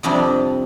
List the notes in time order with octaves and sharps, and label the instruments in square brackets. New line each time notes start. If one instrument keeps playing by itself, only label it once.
[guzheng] F2 C3 G3 D4 D#5